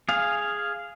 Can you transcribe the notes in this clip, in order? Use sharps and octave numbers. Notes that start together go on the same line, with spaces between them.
G#4 F5